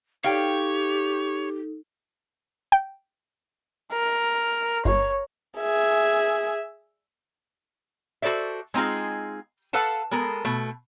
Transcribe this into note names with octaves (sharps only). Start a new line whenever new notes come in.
D#4 G4 A4 C#5 F5 G5
G5
A#4
G1 C#5
G#4 E5
F#4 A4 C5 D5 E5
G#3 C4 D#4 F4 G#4
A4 B4 F5 F#5 A5
G#3 B3 A4 A#4
B2 A3